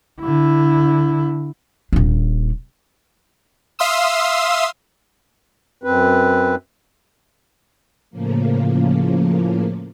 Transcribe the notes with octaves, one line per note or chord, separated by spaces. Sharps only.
D3 E4
D#1 D4
E5 F5 C6 D#6 E6
F#2 C4 B4
A2 C#3 F3 A#3